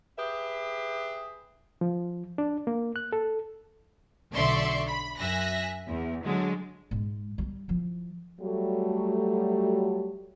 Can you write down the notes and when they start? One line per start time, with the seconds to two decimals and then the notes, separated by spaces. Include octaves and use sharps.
0.18 G4 G#4 B4 E5
1.81 F3
2.38 D4
2.67 A#3
2.96 F#6
3.13 A4
4.34 B1 D3 D5 E5 C6 C#6
4.88 B5
5.20 F#2 E5 G#5 F#6 A#6
5.90 E2
6.25 D3 F#3 G#3
6.91 G#2 G#3
7.38 G3 D#4
7.68 F3 E4
8.41 F#3 G3 A3